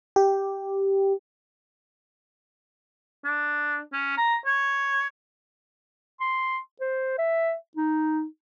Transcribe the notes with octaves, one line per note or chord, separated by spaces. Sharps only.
G4
D4
C#4
A#5
C#5
C6
C5
E5
D#4